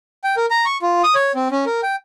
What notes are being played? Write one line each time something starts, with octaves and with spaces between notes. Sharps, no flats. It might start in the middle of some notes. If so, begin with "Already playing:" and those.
G5
A#4
A#5
C#6
F4
D#6
C#5
C4
C#4
A#4
G5